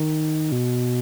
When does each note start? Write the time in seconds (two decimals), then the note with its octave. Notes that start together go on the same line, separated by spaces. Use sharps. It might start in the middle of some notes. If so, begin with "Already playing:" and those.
Already playing: D#3
0.52 B2